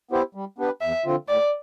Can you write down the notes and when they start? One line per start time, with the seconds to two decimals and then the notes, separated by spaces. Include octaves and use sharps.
0.11 B3 E4 G4 C5
0.35 G3
0.58 B3 D4 G4 B4
0.81 E2 E5
1.05 D3 F3 C4 F4
1.28 A2 D5